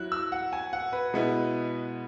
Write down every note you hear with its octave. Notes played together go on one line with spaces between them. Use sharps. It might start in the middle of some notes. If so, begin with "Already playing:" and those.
Already playing: F#3 E4 F#6
E6
F#5
G#5
F#5
B4
B2 G#3 B3 E4